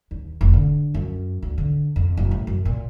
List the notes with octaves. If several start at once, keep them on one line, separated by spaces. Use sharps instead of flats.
D#2
F1
D3
F#2
D2
D3
F2
F#1
A2
F#2
A#2